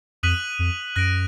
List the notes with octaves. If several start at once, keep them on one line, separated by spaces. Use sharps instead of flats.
F2 D#6 F#6 B6 D#7 F#7
F2
F#2 F#6 A#6 D7